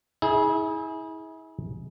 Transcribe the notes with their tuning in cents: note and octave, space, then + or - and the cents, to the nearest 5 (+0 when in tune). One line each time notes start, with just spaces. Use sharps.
E4 -35 G#4 +10